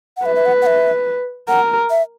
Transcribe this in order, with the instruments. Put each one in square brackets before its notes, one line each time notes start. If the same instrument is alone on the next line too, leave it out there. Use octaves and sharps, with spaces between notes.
[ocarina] F#5
[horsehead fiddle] B4 [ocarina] E5
[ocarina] E5
F#5
F#5
E5
[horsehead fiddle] A#4 [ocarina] F#5
[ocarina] E5